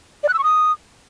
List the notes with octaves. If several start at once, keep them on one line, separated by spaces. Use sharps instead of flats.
D5
F#6
E6
C#6
D#6